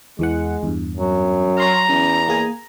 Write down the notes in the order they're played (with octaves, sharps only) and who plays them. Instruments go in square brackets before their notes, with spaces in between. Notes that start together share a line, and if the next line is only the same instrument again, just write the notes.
[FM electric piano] E2 E3 F#5 [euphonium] G#3
[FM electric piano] E2 G2
[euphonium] F#2 [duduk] F#3
[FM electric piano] C#5 C6 F6 [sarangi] A#5
[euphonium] E2 [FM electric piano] C#4
[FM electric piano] A#3 G#4 G#5